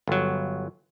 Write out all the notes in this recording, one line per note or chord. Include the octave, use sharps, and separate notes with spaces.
G1 F#3